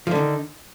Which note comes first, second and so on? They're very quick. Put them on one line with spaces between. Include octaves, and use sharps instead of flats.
F3 D3 D#3